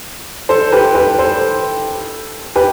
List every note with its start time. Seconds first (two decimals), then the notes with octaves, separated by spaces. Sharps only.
0.49 A4 C5
0.72 G4 B4
0.95 G4 B4
1.19 A4 C5
2.56 G4 B4